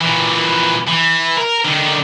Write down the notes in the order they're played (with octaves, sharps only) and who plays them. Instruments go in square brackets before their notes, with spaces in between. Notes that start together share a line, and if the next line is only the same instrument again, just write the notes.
[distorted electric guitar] A#2 E3
E3
A#4
D3 D#3